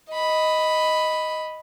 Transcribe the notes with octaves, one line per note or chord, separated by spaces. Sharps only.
D#5 B5